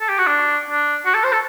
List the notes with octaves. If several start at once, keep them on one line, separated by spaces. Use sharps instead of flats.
A4
G4
F#4
D4
D4
F#4
A4
C5
A4